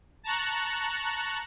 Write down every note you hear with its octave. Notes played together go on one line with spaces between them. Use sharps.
A5 A#5 C#6 F#6